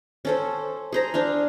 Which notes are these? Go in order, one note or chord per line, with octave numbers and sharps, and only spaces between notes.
C#4 A4 C5
G#4 C5 A#5
D4 C5 F5